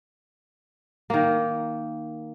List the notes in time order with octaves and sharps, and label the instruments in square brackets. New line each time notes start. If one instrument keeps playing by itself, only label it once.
[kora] D#3 A#3